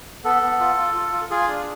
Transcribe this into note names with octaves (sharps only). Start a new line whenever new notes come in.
B3 A4
B3
F4
F4
F4
F4
F4 G#4
D4